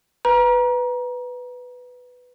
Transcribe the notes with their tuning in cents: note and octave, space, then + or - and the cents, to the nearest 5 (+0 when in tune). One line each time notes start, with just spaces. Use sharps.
B4 +5 A#5 +25